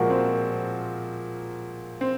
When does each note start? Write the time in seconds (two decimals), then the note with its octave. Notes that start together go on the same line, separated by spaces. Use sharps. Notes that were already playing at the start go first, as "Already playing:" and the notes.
Already playing: A#2 F3 G#3 F#4 A#4
0.10 C4
2.01 C4